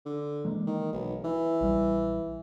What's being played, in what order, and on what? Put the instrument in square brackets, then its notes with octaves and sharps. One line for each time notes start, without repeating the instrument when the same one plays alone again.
[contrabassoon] D3
[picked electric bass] E3 G#3 A#3
[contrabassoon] D#3
B1
E3
[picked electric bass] A#1 G3